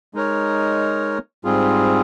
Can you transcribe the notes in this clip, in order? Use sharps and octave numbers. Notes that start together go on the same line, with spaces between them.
G#3 D#4 A#4 C#5
G#2 G3 C4 F4 G#4